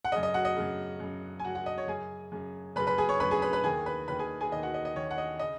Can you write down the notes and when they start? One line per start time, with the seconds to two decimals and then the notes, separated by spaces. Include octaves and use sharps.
0.05 F#5
0.12 C#3 D#5
0.16 F#2
0.23 D#5
0.34 F#4 F#5
0.45 D#5
0.56 F#2 C#3
1.00 F#2 C#3
1.40 G#5
1.44 C#3 F#4 F#5
1.48 F#2
1.55 F#4 F#5
1.66 D#5
1.78 C#5
1.88 F#2 C#3 G#4 G#5
2.32 F#2 C#3
2.76 F#2 C#3 B4 B5
2.87 B4 B5
2.98 G#4 G#5
3.09 C#5 C#6
3.20 F#2 C#3 B4 B5
3.31 G#4 G#5
3.42 B4 B5
3.53 B4 B5
3.64 D#2 D#3 G#4 G#5
3.86 B4 B5
4.08 D#2 D#3 B4 B5
4.19 G#4 G#5
4.41 G#4 G#5
4.52 D#2 D#3 D#5
4.63 F#4 F#5
4.74 D#5
4.85 D#5
4.96 D#2 D#3 C#5
5.11 F#5
5.18 D#5
5.39 C#3 D#5